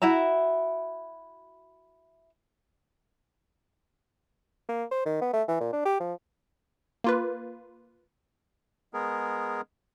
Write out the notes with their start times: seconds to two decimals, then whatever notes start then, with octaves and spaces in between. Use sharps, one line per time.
0.02 E4 F#4 E5 A#5
4.69 A#3
4.91 C5
5.06 D#3
5.21 B3
5.33 A3
5.48 E3
5.60 A#2
5.73 D4
5.85 G4
6.00 F3
7.04 A#3 F4 B4
8.93 G#3 B3 G#4 A#4